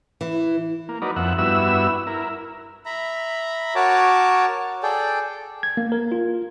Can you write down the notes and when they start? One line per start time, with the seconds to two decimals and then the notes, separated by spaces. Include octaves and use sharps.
0.21 E3
0.89 A#3
1.02 F#3 D#4 A#4 B4 D5
1.16 F2 E5 F#5
1.38 G2 B3 E4 F#4 E5 E6
2.07 E4 A#4
2.86 E5 A#5 B5
3.75 F#4 A#4 C#5 A5 D6
4.83 G#4 A4 D5 G5
5.63 G#6
5.77 A#3
5.92 A#4
6.12 F4